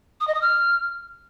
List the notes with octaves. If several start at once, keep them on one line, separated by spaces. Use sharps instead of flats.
D#6
D#5
D#6
F6